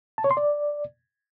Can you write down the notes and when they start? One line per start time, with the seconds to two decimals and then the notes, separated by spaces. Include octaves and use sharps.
0.18 A5
0.24 C#5
0.31 C6
0.37 D5